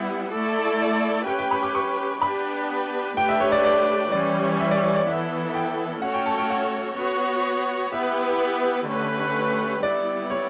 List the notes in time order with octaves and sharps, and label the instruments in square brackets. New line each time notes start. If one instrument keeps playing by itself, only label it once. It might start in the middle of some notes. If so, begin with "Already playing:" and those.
Already playing: [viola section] G3 B3 E4 [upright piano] F#5
[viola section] A3 E4 A4 D5
[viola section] C#4 G4 B4 [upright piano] G5
[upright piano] G5
B5
D6
C#6
[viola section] B3 D4 G4 B4 [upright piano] B5
[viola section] A3 D4 G4 B4 [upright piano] G5
[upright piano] E5
C#5
D5
D5
[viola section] E3 G3 C#4 [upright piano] D5
[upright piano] E5
D5
C#5
D5
[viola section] E3 B3 E4 A4 [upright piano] E5
[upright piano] G5
[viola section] A3 C#4 F#4 A4 C#5 [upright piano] F#5
[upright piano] G5
A5
G5
F#5
[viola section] B3 F#4 C#5
[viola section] B3 E4 G4 B4 [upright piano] E5
[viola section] D3 A3 C#4 G4 B4
[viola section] G3 B3 E4 [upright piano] D5
[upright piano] C#5